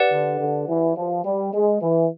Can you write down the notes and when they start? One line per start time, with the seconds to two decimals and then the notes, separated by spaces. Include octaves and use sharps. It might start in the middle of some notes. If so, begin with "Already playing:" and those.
Already playing: G4 B4 D5 F#5
0.11 D3
0.39 D3
0.69 E3
0.96 F3
1.25 G3
1.54 G#3
1.81 E3